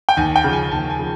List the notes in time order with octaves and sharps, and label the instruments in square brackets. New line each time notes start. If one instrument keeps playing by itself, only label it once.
[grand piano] G5
D#2 G#5
G5
C#3 F3
G#5
D#2 A5
G#5
C#3 F3